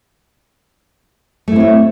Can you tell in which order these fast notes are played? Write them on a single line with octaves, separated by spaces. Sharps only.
A3 E4 C4 C#5